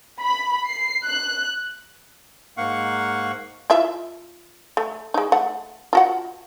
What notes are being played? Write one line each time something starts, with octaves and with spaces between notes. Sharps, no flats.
B5
C7
F#6
G#2 A#3 F5 F#5 C#6
E4 F4 E5
A3
G#3 D#4
A3 F#5
F4 F#4 F#5